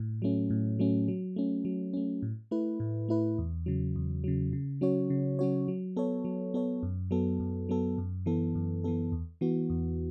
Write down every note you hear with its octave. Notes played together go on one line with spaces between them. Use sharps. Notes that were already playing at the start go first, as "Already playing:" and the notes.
Already playing: A2
F#3 A3 C#4
A2
F#3 A3 C#4
F#3
A3 C#4
F#3
A3 C#4
A2
A3 E4 B4
A2
A3 E4 B4
E2
C#3 F#3
E2
C#3 F#3
C#3
F#3 C#4 F#4 C#5
C#3
F#3 C#4 F#4 C#5
F#3
B3 A4 C#5
F#3
B3 A4 C#5
F#2
F#3 B3 A4
F#2
F#3 B3 A4
F#2
E3 B3 A4
F#2
E3 B3 A4
E2
E3 B3 F#4
E2